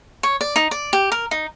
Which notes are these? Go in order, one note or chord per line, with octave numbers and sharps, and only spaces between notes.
C#5
D5
D#4
D5
G4
A#4
D#4